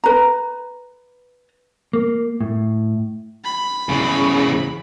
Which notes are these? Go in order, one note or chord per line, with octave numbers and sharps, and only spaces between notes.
B4 A#5
A#3
A2
B5
E2 C#3